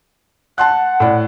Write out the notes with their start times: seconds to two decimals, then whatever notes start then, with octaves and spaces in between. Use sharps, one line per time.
0.58 F#5 A5 C6 F#6
1.00 A2 D5